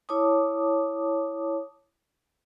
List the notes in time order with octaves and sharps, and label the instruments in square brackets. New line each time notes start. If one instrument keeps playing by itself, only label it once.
[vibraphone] E4 C#5 A5 D6 D#6